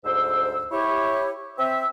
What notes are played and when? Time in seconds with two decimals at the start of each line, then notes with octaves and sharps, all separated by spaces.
0.05 D2 G#2 C5 E6
0.71 E4 G4 C#5
1.58 C4 E5